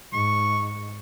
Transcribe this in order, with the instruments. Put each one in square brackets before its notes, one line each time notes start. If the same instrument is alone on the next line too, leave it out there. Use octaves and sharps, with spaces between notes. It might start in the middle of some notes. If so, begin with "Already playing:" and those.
[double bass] G#2 [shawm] C#6